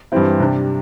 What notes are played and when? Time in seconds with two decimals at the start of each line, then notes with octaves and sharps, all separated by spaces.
0.12 G2 E3 G3 C4 E4
0.40 C3 G3 D4